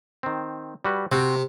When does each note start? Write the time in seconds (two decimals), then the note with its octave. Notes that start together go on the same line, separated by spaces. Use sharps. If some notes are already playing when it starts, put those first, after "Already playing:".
0.23 D#3 C4
0.85 G3 F#4 B4
1.12 C3 C4 F#4